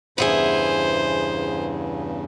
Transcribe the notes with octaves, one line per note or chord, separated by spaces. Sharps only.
E2 G2 C#3 B3 E4 G#4 C5